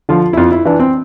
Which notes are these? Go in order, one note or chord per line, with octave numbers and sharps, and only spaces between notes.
D3 F3 F4
E4
F2 F4
E4
E3 D4
C4